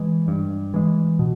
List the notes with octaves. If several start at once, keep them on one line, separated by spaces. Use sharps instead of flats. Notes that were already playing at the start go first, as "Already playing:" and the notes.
Already playing: E3 G#3
G2
E3 G#3
B2